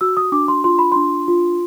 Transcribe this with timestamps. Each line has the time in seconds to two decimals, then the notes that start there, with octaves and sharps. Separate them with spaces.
0.01 F#4 E6
0.17 D#6
0.32 D4 D6
0.48 C6
0.64 F4 C6
0.79 B5
0.92 D4 C6
1.28 F4